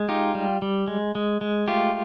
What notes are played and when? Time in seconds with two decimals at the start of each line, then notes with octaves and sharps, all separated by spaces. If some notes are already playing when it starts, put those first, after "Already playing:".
Already playing: G#3
0.09 D#4 F4 G4
0.35 G3
0.62 G3
0.88 G#3
1.15 G#3
1.41 G#3
1.68 A3 F4 G4